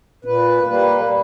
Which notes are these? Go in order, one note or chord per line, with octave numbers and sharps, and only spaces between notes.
A#2 B4
G3 A#3 B4
B4